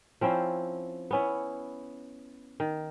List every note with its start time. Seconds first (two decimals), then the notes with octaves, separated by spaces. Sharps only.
0.21 F3 C4 C#4 E4
1.11 B3 C#4 E4
2.60 D#3